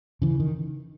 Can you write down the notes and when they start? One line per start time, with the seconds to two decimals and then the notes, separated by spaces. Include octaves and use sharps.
0.22 C#3 E3
0.40 D#3